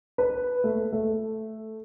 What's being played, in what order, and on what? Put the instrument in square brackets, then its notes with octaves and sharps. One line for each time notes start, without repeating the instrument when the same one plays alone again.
[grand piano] B4
A3
A3